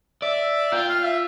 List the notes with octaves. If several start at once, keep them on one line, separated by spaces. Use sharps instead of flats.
D5 E5
F4 G5
F5
E5